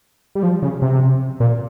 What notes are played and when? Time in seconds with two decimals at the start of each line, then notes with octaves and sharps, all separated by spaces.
0.35 G3
0.43 F3
0.62 C#3
0.82 C3
1.40 A#2